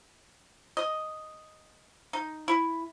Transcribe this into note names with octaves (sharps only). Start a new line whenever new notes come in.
D#5
D#4
E4